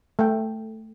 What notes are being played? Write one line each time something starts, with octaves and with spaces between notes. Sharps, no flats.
A3 G5